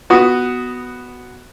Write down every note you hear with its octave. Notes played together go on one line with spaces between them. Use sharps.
B3 F#4 D#6